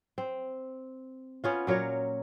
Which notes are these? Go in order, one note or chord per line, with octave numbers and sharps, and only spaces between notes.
C4
B3 C#4 F4
A#2 F#3 A#4 C#5